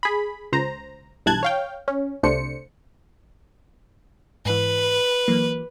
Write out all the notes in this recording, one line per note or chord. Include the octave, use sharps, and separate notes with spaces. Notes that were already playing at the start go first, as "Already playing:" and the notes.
G#4 B5
C#2 C5 A#5
B1 G2 E3 A5 F#6 G#6
C#5 F5 G5
C#4
C2 C3 A3 D4 C5 C#7
G#2 E3 B4
E3 F#3 A#3